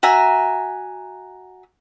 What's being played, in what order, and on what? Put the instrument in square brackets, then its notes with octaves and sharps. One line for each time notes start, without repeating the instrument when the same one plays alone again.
[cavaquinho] F#4 E5 G#5 A#5